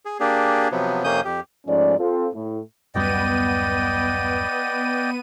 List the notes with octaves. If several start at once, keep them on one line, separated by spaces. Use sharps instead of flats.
G#4
A#3 D4 G4 G#4
C3 F3 F#3 B3
F2 C3 A#3 C#4 D#6 G6
F2 G4
G#2 F3 A3 C#4 D5
C4 F4 A4
A2
D1 F#2 G3 B3 D5 D#5 G5 D#7